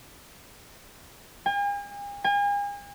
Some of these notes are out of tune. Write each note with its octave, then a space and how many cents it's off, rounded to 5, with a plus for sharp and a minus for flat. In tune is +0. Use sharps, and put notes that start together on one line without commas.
G#5 -45
G#5 -40